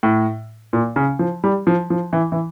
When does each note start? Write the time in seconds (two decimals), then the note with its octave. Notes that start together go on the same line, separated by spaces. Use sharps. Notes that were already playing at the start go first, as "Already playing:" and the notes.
0.03 A2
0.73 A#2
0.96 C#3
1.19 F3
1.44 G3
1.67 F3
1.90 F3
2.13 E3
2.32 E3